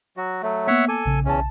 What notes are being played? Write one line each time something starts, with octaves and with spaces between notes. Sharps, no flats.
F#3 F#4
F#3 A3
A#3 B3 C#5 E5 F#5
A4 G#5 D6
A#1 C#3
B1 E2 C#4 A5